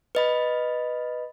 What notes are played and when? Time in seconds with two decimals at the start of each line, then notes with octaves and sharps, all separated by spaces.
0.15 B4 D#5 B5